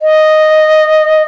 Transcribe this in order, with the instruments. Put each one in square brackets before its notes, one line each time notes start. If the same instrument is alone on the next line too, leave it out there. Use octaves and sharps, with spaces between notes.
[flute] D#5